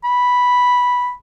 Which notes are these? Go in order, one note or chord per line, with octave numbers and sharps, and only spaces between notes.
B5